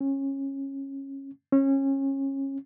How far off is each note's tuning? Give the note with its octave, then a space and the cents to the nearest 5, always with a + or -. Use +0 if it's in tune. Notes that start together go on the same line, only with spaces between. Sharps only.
C#4 -20
C#4 -25